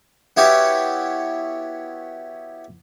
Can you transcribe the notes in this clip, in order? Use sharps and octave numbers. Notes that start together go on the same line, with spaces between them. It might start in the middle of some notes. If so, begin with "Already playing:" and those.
B3 E4 F#4 G4 C#5